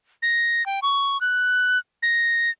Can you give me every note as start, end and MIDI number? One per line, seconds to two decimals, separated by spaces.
0.22 0.65 94
0.66 0.80 79
0.82 1.20 85
1.21 1.78 90
2.03 2.50 94